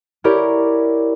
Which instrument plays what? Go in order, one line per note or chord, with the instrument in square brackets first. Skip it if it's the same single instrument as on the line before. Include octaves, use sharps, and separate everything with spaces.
[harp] E4 G4 A#4 C#5 D5